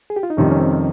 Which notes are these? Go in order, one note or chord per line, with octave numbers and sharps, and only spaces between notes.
G#4
G4
F4
D#4
F2 C3 D#3 G3 C#4
C#4
C4